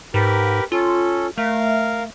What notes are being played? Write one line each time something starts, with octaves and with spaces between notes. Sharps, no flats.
G#2 G4 A#4 B4
C#4 F4 A4
A3 A#4 F5